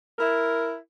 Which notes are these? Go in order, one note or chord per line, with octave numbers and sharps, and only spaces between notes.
E4 A#4